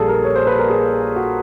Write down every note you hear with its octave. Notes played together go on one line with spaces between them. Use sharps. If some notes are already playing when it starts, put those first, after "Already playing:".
Already playing: A#1 A#2 G3 G#4 A4
A#4
C#5
C5
B4
A#4
G#4
F#4